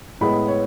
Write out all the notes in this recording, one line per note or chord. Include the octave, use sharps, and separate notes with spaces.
A2 G#3 B3 B5
C#5